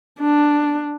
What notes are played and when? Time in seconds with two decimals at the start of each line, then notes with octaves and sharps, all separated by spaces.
0.20 D4